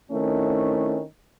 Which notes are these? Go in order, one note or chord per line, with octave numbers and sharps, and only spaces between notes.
D#3 A3 C4 C#4 E4